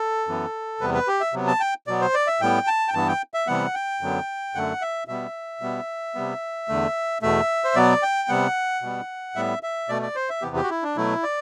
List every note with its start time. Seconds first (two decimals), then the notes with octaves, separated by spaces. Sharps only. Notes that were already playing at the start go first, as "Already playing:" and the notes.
Already playing: A4
0.27 F#2 E3 B3
0.81 E2 C3 G3 B3 B4
0.94 B4
1.08 G4
1.21 E5
1.33 C3 F#3 B3
1.48 A5
1.60 G5
1.87 B2 F#3 B3 D5
2.01 C5
2.14 D5
2.27 E5
2.41 A2 G3 B3 G5
2.67 A5
2.88 G5
2.94 G2 E3 B3 A5
3.08 G5
3.34 E5
3.47 C3 E3 G3 B3 F#5
3.75 G5
4.01 F#2 D3 F#3 B3
4.55 F#2 D3 A3 F#5
4.82 E5
5.08 B2 G3 B3 E5
5.61 B2 G3 B3
6.15 C3 G3 B3
6.69 E2 D3 A3
7.22 E2 B2 A3 E5
7.64 C5
7.75 B2 F#3 B3 D5
8.03 G5
8.28 C3 G3 B3 F#5
8.82 B2 G3 B3
9.35 A2 G3 B3 E5
9.63 E5
9.89 B2 A3 D5
10.02 D5
10.16 C5
10.30 E5
10.42 E2 C3 E3 B3 G4
10.56 G4
10.63 F#4
10.70 E4
10.83 D4
10.96 B2 F#3 A3 E4
11.23 D5